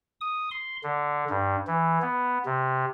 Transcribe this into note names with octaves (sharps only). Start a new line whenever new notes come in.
D#6
C6
D3
G2
E3
B3
C3